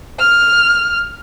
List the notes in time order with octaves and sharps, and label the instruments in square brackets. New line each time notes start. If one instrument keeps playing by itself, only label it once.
[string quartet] F6